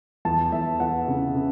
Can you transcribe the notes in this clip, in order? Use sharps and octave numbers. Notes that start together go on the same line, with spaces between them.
E2 A5
E2 E5
E2 F#5
C#3
C#3